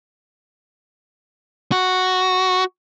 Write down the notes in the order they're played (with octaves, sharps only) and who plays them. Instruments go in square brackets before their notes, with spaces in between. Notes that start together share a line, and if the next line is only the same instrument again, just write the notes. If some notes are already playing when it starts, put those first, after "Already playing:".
[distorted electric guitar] F#4